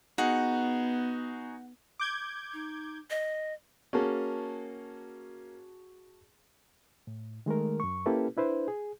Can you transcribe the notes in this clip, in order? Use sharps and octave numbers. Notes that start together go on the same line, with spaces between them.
B3 D#4 F#4 G#4 F#5
D6 G6 G#6
D#4
D#5
A#3 C#4 F#4 G#4 A5
A2
D#3 G#3 A3 A#4
F#2 C#6
A#3 C#4 E4 G4 A4 B4
D4 E4 B4 C5
G#4